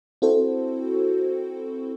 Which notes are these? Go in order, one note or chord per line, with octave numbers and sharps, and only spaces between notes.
C4 E4 F#4 A4 C5